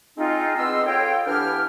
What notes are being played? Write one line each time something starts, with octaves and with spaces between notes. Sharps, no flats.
G#3 C4 D#4 F4
G#3 B3 C4 D#5 C6 E6
F4 A4 C#5 G5
E3 B3 D4 G4 G5 F6